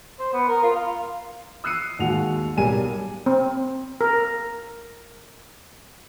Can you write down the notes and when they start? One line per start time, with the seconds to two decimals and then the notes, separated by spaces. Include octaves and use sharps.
0.19 C5
0.33 B3
0.48 A#4
0.63 F4
0.76 F5
1.64 D#6 E6 F#6 C7 C#7 D#7
1.99 D#2 G#3 F#4 F#5 F7
2.57 B1 G3 G4 A#4 G#5 D#7
3.26 C4
4.01 A#4